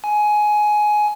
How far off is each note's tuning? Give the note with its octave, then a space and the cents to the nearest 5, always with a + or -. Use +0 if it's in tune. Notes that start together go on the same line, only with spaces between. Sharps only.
G#5 +15